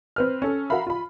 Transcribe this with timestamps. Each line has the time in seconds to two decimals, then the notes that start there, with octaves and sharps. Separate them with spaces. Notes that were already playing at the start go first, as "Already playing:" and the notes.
0.16 C4 B4 F6
0.42 C#4 A4
0.70 F#4 A#4 E5 F5 B5
0.87 F4 B5